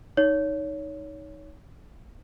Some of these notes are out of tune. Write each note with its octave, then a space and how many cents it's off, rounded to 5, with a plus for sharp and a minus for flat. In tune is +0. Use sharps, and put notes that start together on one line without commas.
D#4 +5 C#5 +20